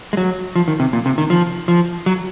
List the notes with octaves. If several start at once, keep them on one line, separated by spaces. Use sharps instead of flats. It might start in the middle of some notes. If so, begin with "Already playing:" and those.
G#3
F#3
F3
D#3
C3
A#2
C3
D#3
F3
F3
F#3